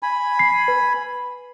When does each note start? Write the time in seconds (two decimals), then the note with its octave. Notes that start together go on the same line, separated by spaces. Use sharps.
0.03 G#5 B5
0.39 C7
0.68 B4